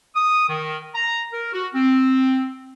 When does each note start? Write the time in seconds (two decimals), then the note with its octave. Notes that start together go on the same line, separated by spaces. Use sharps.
0.16 D#6
0.49 D#3
0.94 A#5
1.32 A#4
1.53 F#4
1.74 C4